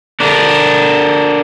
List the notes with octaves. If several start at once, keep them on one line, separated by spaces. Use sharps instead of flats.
D4 A4 A#4